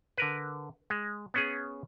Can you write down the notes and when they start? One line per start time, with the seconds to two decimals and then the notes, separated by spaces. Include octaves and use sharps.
0.17 D3 A#4 B4
0.90 G#3
1.34 B3 C#4 G#4